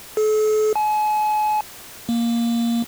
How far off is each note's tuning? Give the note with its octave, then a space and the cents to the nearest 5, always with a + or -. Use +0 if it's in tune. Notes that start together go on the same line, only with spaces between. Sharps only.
A4 -40
G#5 +40
A#3 +5